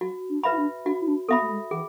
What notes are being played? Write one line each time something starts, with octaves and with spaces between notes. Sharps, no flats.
F#3 F#4
D4
B4 E5 B5
E4
D4
D4 F#4
E4
D4
B3 A4 E5 B5
A3
G#3
E3 G#4